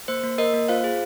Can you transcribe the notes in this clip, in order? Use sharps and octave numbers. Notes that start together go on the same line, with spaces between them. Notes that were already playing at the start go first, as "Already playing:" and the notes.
A#3 C5
A#3
A#3 A#4 D#5
A#3
F4 C5 F5
G#4